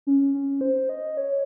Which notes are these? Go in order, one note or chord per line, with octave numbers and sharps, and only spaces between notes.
C#4
C#4
C5
D#5
C#5